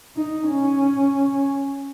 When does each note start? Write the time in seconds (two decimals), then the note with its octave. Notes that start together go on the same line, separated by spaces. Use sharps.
0.16 D#4
0.48 C#4